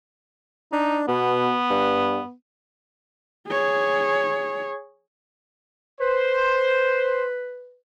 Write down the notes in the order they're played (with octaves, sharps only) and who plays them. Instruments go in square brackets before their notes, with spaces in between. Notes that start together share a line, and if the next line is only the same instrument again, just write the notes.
[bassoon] D4 [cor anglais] D#4
[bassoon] B2 [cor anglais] B3
[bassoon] G2
[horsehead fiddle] G#4 C#5
[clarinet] B4 [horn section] C5